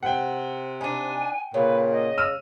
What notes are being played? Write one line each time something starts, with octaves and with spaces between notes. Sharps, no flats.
C3 F#5 G5
D4 D#4 G#5
A#2 C#3 B4
D#5
E6 F6 D#7